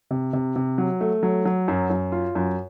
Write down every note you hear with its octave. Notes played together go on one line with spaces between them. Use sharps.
C3
C3
C3
F#3
A3
F#3
F#3
F#2
F#2
F4
F#2